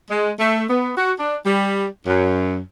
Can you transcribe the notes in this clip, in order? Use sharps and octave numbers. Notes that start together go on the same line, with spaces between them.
G#3
A3
B3
F#4
D4
G3
F#2